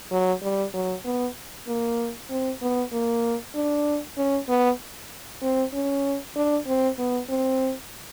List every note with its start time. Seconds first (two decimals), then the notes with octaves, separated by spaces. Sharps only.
0.11 F#3
0.42 G3
0.74 F#3
1.05 B3
1.68 A#3
2.30 C4
2.61 B3
2.92 A#3
3.55 D4
4.17 C#4
4.48 B3
5.42 C4
5.73 C#4
6.36 D4
6.67 C4
6.98 B3
7.29 C4